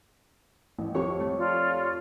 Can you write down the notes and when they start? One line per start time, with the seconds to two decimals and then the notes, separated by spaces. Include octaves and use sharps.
0.78 A1
0.95 F2 G4 C#5 C#6
1.20 A3
1.38 F4 C#5 D5